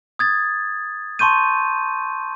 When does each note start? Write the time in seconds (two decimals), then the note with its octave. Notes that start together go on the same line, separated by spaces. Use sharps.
0.19 D#6 G#6 A6
1.19 A5 C6 C#6 G6 D#7